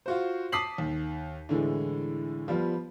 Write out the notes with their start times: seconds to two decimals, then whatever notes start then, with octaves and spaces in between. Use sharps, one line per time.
0.06 F4 F#4 C5
0.52 A5 D6 D#6 B6 C7 F#7
0.78 D#2
1.49 A2 D3 E3 G#3
2.48 F3 G3 B3 F4